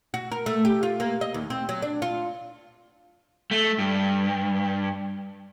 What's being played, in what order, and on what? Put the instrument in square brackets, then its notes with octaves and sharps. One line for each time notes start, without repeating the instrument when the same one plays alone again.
[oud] F#4
A#4
A3
G4
F4
A#3
D#5
D#2
C4
F#3
D4
F4
[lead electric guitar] A3
G2